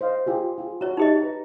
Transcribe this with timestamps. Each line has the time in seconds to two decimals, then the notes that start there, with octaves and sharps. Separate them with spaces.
0.01 C5 D#5 F5
0.26 F4 G4 G#4
0.58 F4 G#4
0.81 F#4 C#5 A#5
0.97 D#4 G4 D#5
1.21 B4 A#5